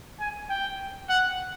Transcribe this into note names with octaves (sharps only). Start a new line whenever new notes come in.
G#5
G5
F#5